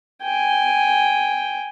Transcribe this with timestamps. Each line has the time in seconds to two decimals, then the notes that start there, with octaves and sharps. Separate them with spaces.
0.23 G5 G#5